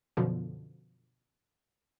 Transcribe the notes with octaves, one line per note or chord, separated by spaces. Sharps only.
F#2 B2 D3 F3